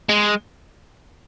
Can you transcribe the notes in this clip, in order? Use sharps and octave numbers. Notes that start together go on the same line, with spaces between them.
G#3